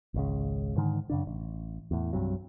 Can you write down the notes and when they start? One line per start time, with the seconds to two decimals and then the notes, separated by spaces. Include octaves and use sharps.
0.14 G#1 C#2 C#3
0.77 G#2 D3 D#3
1.10 F#2 C#3 D4
1.27 A1
1.91 E2 A2
2.13 C2 G2 C3 F#3